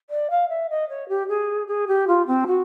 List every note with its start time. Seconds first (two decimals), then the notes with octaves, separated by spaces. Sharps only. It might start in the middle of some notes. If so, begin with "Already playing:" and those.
0.10 D5
0.30 F5
0.49 E5
0.69 D#5
0.89 C#5
1.08 G4
1.28 G#4
1.67 G#4
1.87 G4
2.07 F4
2.27 C4
2.47 F#4